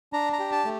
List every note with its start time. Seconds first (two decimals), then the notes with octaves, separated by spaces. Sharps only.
0.13 D4 A#5
0.33 A#5
0.39 G4
0.52 A5
0.65 A3